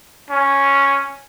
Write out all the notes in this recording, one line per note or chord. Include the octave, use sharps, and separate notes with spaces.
C#4